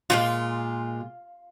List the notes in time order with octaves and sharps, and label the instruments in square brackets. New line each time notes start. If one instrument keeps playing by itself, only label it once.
[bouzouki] A#2 F#3 G#3 [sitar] F4